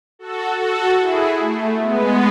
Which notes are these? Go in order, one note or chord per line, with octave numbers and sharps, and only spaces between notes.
F#4 A4
F#4 A4
E4 G#4
A3
G#3 B3